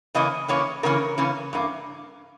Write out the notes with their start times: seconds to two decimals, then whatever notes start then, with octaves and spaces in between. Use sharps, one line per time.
0.14 C#3 E3 A#3 C#4 D#5
0.48 C#3 E3 A#3 C#4 C#5
0.83 C#3 E3 A#3 C#4 A#4
1.18 C#3 E3 A#3 C#4
1.53 G2 E3 A#3